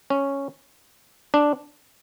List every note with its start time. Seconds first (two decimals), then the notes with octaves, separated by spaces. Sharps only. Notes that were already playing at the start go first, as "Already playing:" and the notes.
0.10 C#4
1.34 D4